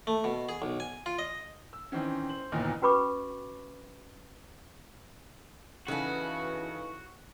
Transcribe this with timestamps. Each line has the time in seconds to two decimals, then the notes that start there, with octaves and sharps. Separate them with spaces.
0.07 A3
0.24 B2
0.49 G#4
0.62 B1
0.80 G#5
1.06 F4
1.19 D#5
1.73 E6
1.92 D#3 E3 C4 C#4
2.29 C5 F#7
2.52 G1 D#2 A#2 E3 D#4 F6
2.82 C#4 F#4 B4 B5 C#6 D6
5.88 C#3 E3 D#4 F#4 A4 B4 F#5 G#5